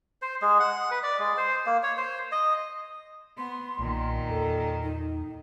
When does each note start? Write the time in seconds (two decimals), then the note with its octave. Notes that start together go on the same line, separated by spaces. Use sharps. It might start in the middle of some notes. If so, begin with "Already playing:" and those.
0.22 C5
0.42 G#3
0.60 F#5
0.91 B4
1.03 D5
1.19 G#3
1.37 C5
1.66 A#3
1.83 C#5
1.97 C5
2.32 D#5
3.38 B3 C6
3.79 B1 A#2 D#3
4.29 E2 A4
4.83 D#4